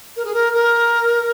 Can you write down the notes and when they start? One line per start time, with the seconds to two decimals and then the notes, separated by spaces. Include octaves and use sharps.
0.16 A#4
0.24 G#4
0.33 A#4
0.53 A#4